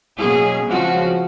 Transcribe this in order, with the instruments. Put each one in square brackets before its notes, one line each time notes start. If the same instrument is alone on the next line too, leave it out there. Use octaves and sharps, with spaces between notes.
[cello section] B2 F#3 A#3 C#4 G#4
C#3 F3 G#3 C4 F#4